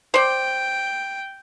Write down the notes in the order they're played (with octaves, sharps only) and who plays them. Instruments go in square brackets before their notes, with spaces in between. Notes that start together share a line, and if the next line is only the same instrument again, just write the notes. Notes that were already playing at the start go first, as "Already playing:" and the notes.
[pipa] C5 D5 [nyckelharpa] G5